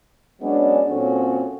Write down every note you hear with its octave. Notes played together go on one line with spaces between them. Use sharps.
F#3 G#3 B3 C#4 D4
A#2 F#3 C4 C#4 F#4 A4